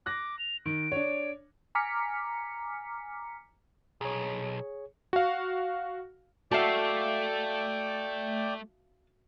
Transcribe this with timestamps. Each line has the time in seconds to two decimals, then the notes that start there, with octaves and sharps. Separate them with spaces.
0.06 D6 F#6 A#6
0.39 F7
0.66 D#3 D7
0.92 D4 C#5
1.75 G#5 A#5 D6 F6 B6 C#7
4.01 B1 G#4 C#5
5.13 F#4 F5
6.51 A3 F#4 D5 E5 F5 G5 A5 D6